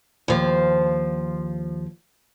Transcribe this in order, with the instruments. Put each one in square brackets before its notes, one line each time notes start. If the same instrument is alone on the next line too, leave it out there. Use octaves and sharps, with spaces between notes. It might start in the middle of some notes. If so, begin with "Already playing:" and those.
[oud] D#2 F3